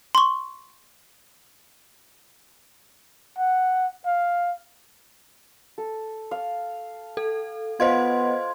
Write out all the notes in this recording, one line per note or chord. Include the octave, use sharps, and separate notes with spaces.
C6 C#6
F#5
F5
A4
F5
A4
B3 F4 C5 D#5 G#6